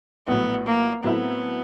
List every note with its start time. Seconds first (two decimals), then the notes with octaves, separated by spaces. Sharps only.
0.28 A#1 A2 F#3 B3
0.66 A#3
1.04 A2 F#3 A3 B3 C4 E4